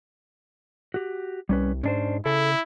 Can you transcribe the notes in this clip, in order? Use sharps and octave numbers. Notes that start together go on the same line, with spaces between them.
F#4 G4
C2 G3 C#4 B4
G#2 C#4 D4 C5
C#3 E4 A4